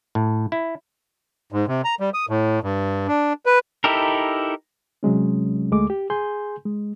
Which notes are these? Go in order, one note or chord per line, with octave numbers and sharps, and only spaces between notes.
A2
E4
G#2
C3
A#5
G3
D#6
A2
G2
D4
B4
D#4 E4 G4 A4 A#4
C3 F#3 G#3 C#4
D2 G#3 A3 D6
G4
G#4 G#5 C6 G6
G#3